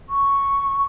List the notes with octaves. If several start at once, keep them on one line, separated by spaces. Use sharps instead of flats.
C#6